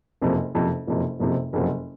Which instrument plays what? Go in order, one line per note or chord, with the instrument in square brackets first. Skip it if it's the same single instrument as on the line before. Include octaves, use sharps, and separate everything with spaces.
[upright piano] F#1 F2 C3
F#1 F2 C3
F#1 F2 C3
F#1 F2 C3
F#1 F2 C3 F#3